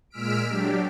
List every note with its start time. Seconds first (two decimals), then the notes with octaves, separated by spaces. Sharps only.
0.10 A#2 G#3 E6 F6 B6 D7
0.49 F#3 D4 G4